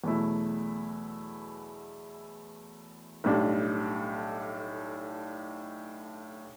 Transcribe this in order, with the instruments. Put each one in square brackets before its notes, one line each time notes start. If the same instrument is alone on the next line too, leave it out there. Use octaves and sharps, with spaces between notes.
[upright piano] E2 B2 F#3 A3 E4
B1 A2 G3 D4